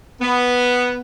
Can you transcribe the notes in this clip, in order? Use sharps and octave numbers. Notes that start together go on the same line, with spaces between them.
B3